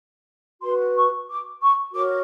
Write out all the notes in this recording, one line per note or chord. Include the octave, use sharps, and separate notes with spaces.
F#4 B4 C6
C#6
D6
C#6
F#4 A#4 C#5 D6